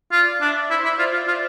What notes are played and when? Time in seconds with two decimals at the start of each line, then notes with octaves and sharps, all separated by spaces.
0.12 F4 D5
0.40 D4 E5
0.70 E4 C5
0.84 E4
0.99 F4 D5
1.13 F4
1.28 F4